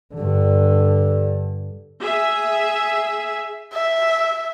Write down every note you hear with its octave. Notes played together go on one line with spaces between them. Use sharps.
G2 D3
G#4 E5
E5